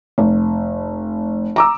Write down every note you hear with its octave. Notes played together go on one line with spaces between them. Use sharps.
F1
A#5 D6 E6